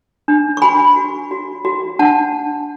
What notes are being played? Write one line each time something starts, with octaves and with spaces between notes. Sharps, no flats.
D4
C#6
F#4 G#5 B5
F#4
F#4
F#4
D4 F#5 A5